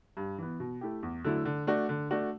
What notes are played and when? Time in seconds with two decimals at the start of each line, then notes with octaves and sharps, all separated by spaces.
0.17 G2
0.38 E3 B3
0.60 B2
0.81 A3 E4 G4
1.03 E2
1.24 D3 F#3 A3 E4
1.45 D3
1.67 A3 D4 F#4
1.89 D3
2.11 A3 D4 F#4